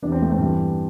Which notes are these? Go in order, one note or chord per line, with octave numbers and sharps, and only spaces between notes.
E2 C3 E3 D4
C4
A3
C4
G2 E3